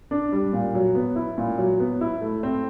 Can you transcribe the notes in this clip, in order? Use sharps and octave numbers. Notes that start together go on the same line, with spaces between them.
D4
G3
A#2
F#3
B3
E4
A#2
F#3
B3
E4
A3
C4